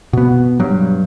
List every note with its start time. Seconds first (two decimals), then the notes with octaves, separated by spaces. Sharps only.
0.13 B2 B3
0.60 G2 F#3